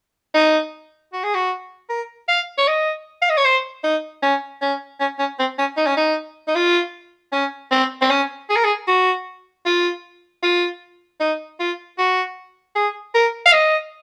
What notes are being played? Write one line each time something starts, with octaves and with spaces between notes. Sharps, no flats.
D#4
F#4
G#4
F#4
A#4
F5
C#5
D#5
F5
D#5
C#5
C5
D#4
C#4
C#4
C#4
C#4
C4
C#4
D#4
C#4
D#4
D#4
F4
C#4
C4
C4
C#4
G#4
A#4
G#4
F#4
F4
F4
D#4
F4
F#4
G#4
A#4
F5
D#5